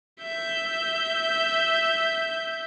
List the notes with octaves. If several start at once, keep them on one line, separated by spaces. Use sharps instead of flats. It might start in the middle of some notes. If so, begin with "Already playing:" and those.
E5 G6